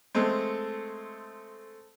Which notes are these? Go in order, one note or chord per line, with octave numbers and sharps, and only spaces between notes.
G#3 A3 C4